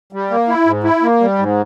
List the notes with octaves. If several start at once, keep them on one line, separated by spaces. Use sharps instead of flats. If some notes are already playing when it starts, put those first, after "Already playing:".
G3
A#3
E4
G#2
E4
A#3
G3
G#2